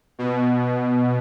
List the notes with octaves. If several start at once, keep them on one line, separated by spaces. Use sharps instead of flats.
B2